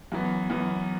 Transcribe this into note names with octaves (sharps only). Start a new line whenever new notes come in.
F#2 E3 B3
F#2 E3 B3